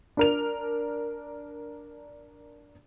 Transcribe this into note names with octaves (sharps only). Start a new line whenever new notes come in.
D4 A#4 F7